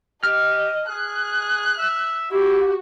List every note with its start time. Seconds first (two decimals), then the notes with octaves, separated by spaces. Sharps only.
0.23 G4 D#5 F6
0.89 G#4 F#6
1.79 E5
2.32 E4 F#4 G4